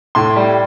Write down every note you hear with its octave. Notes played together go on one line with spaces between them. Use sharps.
A2 C6
G3